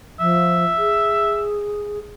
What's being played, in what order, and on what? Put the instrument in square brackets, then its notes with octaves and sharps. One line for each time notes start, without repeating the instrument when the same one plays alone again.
[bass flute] F3 [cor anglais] E5
[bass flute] G#4